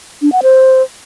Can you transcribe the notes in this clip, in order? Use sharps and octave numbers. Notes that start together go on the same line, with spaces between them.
D4
F#5
C5